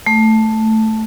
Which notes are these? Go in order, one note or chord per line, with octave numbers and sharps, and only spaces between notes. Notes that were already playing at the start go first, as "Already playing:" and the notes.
A3